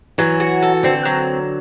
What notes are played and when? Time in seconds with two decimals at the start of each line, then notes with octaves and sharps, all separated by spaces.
0.18 E3 F#3
0.40 F#4
0.62 A4
0.83 D3 C4
1.05 F#3